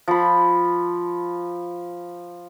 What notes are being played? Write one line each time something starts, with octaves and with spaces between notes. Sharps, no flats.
F3 B5